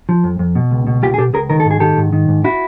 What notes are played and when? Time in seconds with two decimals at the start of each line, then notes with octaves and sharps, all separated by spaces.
0.09 F3
0.24 F2
0.39 F2
0.55 B2
0.71 C#2
0.87 B2
1.03 C#2 F4 G4
1.14 G#4
1.18 B2 G4 A4
1.33 C#2 G#4 A#4
1.50 D#3 A#4
1.60 A4
1.65 G#2
1.71 G#4
1.80 D#3 G4 A4
1.97 G#2
2.13 D#3
2.29 G#2
2.44 E4 F#4